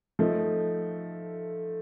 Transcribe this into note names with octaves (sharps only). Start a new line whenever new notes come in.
F3 A3 D#4